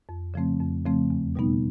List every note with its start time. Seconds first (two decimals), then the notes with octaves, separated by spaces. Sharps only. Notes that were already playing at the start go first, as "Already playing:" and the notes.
0.09 F2
0.34 C#3 F3 A3 C4
0.60 F2
0.85 C#3 F3 A3 C4
1.10 E2
1.35 B2 G3 B3 D#4